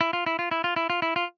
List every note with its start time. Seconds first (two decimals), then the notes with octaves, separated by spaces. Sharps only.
0.01 E4
0.13 F4
0.26 E4
0.39 F4
0.51 E4
0.64 F4
0.76 E4
0.90 F4
1.02 E4
1.16 F4